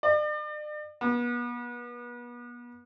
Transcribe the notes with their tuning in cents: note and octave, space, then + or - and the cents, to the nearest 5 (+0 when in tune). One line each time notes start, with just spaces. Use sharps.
D5 +40
B3 -35